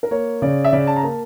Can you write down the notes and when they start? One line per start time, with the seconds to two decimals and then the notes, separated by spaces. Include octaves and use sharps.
0.03 A#4
0.11 A#3 C#5
0.42 C#3 D5
0.65 E5
0.72 C#3 D5
0.87 A5
0.96 A#5
1.03 A#3 A5